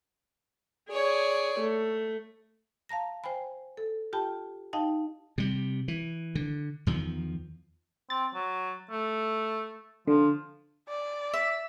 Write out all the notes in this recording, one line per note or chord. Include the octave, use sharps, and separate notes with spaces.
G#4 C#5 D5
A3
F5 A5 A#5 A#6
C5 G5 G#5 B5
A4
F4 G4 G5 A5 B5
D#4 D#5 F5 G5 A5
C3 G3
E3
D3
E2 D#3 F3
C4 A6
F#3
A3
D3 F3
D5
E5